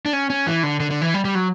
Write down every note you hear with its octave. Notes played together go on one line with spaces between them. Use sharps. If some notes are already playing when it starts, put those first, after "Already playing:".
D4
C#4
C#4
E3
D3
D3
D3
E3
G3
G3
F#3